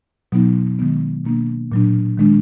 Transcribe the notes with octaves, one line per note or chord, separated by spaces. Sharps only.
B2 F#3 B3 D#4
D#3 G#3 B3
B2 A#3 D4
A#2 F#3 D4
D#3 G#3 D4